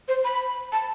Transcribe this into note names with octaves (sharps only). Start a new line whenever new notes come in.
C5
B5
A5